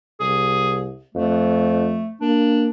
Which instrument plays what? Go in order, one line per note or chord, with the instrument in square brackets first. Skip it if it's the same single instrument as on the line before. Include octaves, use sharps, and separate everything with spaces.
[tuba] C2 [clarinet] G#4
[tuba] F2 [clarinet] A3
[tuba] A#3 [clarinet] D4